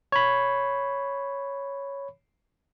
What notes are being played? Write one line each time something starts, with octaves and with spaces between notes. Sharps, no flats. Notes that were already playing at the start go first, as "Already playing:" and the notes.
C#5 B5